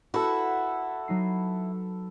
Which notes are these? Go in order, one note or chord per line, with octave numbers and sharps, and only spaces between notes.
E4 F#4 A4 B4
F#3 D#4 C7